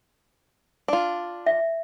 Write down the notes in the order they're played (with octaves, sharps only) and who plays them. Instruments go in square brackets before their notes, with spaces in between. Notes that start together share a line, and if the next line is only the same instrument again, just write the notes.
[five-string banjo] D4 F4
[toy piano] E5